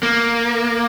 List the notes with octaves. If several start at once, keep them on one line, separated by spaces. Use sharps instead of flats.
A#3